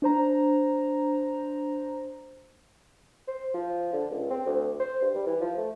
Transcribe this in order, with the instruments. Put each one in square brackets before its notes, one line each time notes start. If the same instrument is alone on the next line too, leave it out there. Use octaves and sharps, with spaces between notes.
[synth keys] D4 C5 A#5
[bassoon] C5
F3
D3
C#2
C4
D2
C5
G2
G3
E3
F3
A3